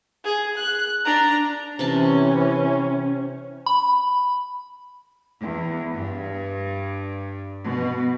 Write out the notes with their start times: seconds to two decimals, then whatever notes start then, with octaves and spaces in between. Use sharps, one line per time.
0.24 G#4
0.57 F#6
1.06 D4 A#5
1.79 C3 E3 C#4 B4 A5
3.66 B5
5.41 E2
5.93 G2
7.66 B2